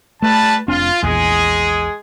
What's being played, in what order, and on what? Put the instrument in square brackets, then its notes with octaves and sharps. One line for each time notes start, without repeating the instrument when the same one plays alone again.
[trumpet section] G3 B4 A5 [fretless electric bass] A3
[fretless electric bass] F1 C4 D4 [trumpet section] F4
[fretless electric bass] A#1 E2 [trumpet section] G#3 G#4